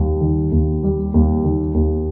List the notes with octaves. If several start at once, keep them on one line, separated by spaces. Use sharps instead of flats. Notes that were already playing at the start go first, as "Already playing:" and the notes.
Already playing: D#2 G3
D#3
D#2
G3
D#2
D#3
D#2